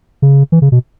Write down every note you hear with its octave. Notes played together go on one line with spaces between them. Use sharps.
C#3
E3
C#3
B2